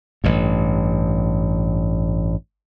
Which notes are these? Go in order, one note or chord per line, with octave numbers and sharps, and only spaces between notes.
A1 G2